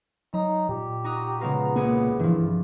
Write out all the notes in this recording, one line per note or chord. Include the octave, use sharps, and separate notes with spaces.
F#3 D#4 A#5
A#2 G4
D#4 F#4 A#5 D#6
C#3 G#3 B3 F4 A#5
C2 A#3 G#4 C#7
G2 E3 F3